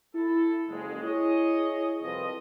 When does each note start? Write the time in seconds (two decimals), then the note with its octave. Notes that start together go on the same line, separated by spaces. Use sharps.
0.15 E4 A4
0.69 F#1 F2 G#3
1.03 E4 G#4 C#5 D#5
2.02 C2 F2 F3 C4 B4 D#5